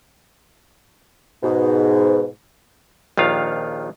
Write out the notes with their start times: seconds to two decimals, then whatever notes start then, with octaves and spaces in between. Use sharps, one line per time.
1.43 G#2 B2
3.17 A#1 D#2 D#3 F4 F5